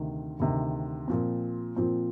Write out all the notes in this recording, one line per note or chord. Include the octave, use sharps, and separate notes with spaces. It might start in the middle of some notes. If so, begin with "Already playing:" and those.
Already playing: D2 C3 D#3
D2 C3 D#3
A#2 F3 C4
A#2 F3 C4